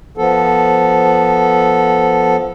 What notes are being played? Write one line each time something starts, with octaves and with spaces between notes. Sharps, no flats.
F3 B3 A4